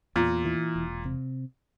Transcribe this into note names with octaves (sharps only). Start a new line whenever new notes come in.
E2 A#2
E3
E1
C3